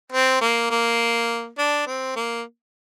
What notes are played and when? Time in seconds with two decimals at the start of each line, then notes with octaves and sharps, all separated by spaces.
0.12 C4
0.41 A#3
0.70 A#3
1.58 D4
1.87 C4
2.16 A#3